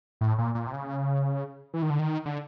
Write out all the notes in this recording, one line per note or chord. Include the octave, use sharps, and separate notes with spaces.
A2
A#2
A#2
C3
C#3
E3
D#3
D3
D#3
D3